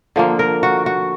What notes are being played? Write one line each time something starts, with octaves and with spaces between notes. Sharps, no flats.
D3 F3 A#3
A#4
F#4
F#4